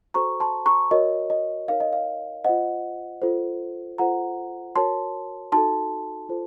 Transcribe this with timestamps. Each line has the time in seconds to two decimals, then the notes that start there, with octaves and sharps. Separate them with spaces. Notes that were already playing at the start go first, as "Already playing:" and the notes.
0.14 F#4 A4 C5 A#5 C#6
0.40 A5 C6
0.66 A#5 C#6
0.91 F#4 A#4 C#5 D#5
1.30 D#5
1.68 D#4 A#4 C#5 F5
1.80 D#5
1.93 F5
2.45 F4 C5 D#5 F#5
3.22 F4 A4 C5
3.98 F4 A4 C5 F#5 A#5
4.76 F#4 A#4 C#5 A5 C6
5.52 D#4 F#4 A4 A5 C6
6.29 F4 A4 C5